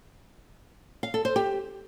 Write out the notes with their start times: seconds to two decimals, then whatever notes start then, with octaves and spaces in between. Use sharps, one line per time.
1.03 F5
1.14 A4
1.25 C5
1.36 G4